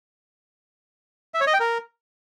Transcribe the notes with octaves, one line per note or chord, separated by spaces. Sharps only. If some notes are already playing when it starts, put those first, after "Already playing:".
E5
C#5
D#5
G5
A#4